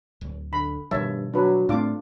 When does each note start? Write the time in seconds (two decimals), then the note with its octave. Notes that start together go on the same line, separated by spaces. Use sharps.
0.21 D1
0.53 D3 B5
0.91 G2 B2 D#3 F3 C#5 E5 A5
1.34 F#3 D4 B4
1.69 A2 A3 C4 D4 F4 D6